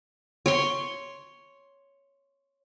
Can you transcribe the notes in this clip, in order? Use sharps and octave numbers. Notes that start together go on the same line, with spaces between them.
C#5 C6